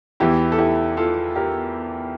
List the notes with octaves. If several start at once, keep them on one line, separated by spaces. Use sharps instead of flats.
E2 E3 E4 G4
A4
E4 G4
F4 A4
G4 A#4